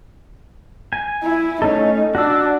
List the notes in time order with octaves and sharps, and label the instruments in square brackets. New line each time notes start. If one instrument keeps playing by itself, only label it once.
[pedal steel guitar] G#5
[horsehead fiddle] E4
[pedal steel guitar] A3 C#4 A4 [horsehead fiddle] D#4
[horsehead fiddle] D4 [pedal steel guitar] F#4 E6